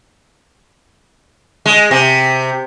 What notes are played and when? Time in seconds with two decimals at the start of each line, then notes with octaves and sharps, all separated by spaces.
1.66 G#3
1.91 C3